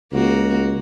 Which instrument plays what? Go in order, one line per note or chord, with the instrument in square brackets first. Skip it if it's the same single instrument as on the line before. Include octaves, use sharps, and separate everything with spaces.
[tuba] C#2 [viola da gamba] A#3 F#4